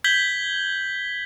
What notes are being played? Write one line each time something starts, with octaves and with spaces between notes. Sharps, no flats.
G6 G#6 B6 F#7 G7